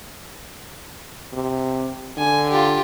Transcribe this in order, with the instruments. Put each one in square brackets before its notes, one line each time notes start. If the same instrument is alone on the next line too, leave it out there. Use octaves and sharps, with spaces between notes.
[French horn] C3
[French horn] D3 [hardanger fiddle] G#5
[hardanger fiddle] F4 G4